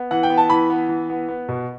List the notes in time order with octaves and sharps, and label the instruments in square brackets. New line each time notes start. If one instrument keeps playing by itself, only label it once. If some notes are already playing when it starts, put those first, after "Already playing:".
Already playing: [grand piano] B3
E3 F#5
G5
B3
A5
E3 B5
B3
E3
B3
B3
B2